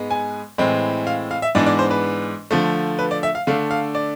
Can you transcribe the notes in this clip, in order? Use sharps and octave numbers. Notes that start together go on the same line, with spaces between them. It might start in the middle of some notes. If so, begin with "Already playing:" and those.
Already playing: G#2 G#3 B3
G#5
A2 E3 G#3 C4
F5
F5
E5
G#2 E3 G#3 B3 D4 D5
D5
C5
B4
D3 F3 A3
B4
D5
E5
F5
D3 A3 D4 F5
F5
D5